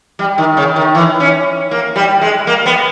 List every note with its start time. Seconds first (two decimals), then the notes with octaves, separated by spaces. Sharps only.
0.19 G3
0.38 D#3
0.57 C#3
0.76 D#3
0.95 E3
1.20 C#4
1.71 A#3
1.96 G3
2.21 G#3
2.47 A#3
2.66 B3